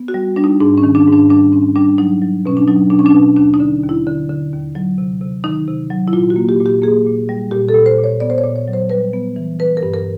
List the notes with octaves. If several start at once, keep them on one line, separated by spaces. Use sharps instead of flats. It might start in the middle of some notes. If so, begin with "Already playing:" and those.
Already playing: B3
F#4
G3
G3 D4
D#4
G#2 D4
C#4
D#3
D4
G#2
D4
G3 D4
G#2 C#4
G3 D4
F#3 D#4
F#3
B2 C#4
D4
F#3 D#4
B2 D4
C#4
D4
B2
D#2 D4
D#4
D3
D#2
E4
D3
D3
D#2
F#3
C3
C3
D#3 D#4
C3
F#3
E4
A#2 F4
F#4
A#3
G4
A#2
G4
A#3 G#4
A#2
G3
A#2 G4
A4
A#2
C5
A#2
C#5
B3 D5
C5
C#5
A#2
C#5
F#3
C5
G3 B4
B3
E3
E3 B4
A#4
G2
A#4